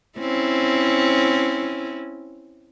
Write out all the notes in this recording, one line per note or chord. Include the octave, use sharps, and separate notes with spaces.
C4 C#4 E4